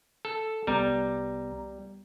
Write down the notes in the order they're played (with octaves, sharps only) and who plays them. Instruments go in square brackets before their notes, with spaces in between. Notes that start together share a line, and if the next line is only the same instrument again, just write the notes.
[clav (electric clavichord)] A4
[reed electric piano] C2 B3 A#5 [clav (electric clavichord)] G3